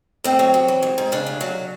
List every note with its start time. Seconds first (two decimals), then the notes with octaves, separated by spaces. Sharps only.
0.24 A2 C4
0.39 F#3
0.54 F#3
0.68 E3
0.83 G#2
0.98 G#2
1.12 C#3 D4
1.26 D2
1.41 F#3